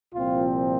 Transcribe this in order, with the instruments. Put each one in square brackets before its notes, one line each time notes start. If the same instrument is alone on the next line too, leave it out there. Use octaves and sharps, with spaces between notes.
[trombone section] C2 A#2 F3 C4 F4